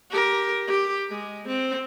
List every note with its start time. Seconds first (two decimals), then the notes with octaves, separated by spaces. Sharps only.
0.10 G4 A#4
0.68 G4
1.10 G#3
1.48 C4